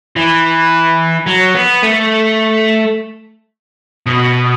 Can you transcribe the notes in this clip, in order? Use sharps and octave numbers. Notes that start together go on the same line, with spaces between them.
E3
F#3
B3
A3
B2